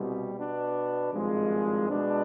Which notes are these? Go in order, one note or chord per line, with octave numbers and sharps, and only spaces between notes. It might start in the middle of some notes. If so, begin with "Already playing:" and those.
Already playing: C2 B2 G3
B2 B3 D4
G#1 G2 F3 G#3
B2 G#3 D4